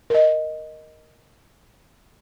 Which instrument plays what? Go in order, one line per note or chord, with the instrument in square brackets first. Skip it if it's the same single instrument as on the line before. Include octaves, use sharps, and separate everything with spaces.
[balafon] A#4 D#5